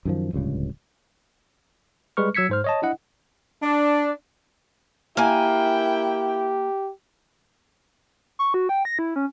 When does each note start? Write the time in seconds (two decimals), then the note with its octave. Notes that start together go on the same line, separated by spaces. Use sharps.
0.05 F#2 D#3 F3
0.33 D1 C#2 G2 C#3
2.17 G3 G#3 B4 C#6 F6
2.35 F#3 E6 G#6 B6 C#7
2.49 G#2 C5 F6
2.64 C#5 D#5 A5
2.82 D4 E4 D#5 F#5
3.63 D4
5.17 A#3 E4 G4 G5 G#5
8.39 C#6
8.54 F#4
8.69 G5
8.85 A#6
8.99 E4
9.16 C#4